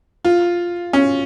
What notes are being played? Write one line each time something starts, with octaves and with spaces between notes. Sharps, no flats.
F4
C#4